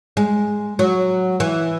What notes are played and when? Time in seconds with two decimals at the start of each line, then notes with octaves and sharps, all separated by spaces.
0.17 G#3
0.79 F#3
1.40 E3